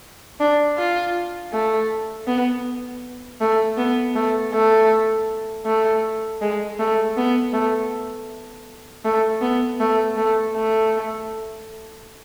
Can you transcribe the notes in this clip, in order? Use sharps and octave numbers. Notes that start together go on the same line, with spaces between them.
D4
F4
A3
B3
A3
B3
A3
A3
A3
G#3
A3
B3
A3
A3
B3
A3
A3
A3